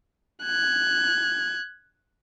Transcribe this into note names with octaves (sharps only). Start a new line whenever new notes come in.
F#6 G#6